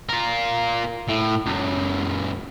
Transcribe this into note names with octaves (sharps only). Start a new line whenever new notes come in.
F4 A#4
A2
C#2 F#2